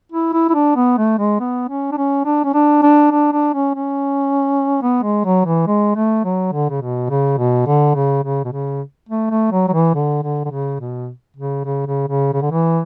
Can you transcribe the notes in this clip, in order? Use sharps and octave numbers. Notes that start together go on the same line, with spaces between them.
E4
E4
E4
D4
B3
A3
G#3
B3
C#4
D4
C#4
D4
C#4
D4
D4
D4
D4
C#4
C#4
B3
G#3
F#3
E3
G#3
A3
F#3
D3
C#3
B2
C#3
B2
D3
C#3
C#3
B2
C#3
A3
A3
F#3
F#3
E3
D3
D3
D3
C#3
B2
C#3
C#3
C#3
C#3
C#3
D3
E3